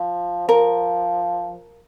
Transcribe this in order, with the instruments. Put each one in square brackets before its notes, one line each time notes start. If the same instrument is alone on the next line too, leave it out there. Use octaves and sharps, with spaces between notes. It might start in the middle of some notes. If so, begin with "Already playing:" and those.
Already playing: [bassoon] F3
[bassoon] F3 [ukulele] A#4